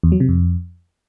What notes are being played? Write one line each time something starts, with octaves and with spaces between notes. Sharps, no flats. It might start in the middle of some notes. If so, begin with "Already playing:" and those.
E2
F#3
C3
F2